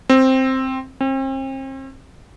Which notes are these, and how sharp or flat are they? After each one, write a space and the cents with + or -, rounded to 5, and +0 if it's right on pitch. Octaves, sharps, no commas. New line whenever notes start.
C4 +5
C4 +40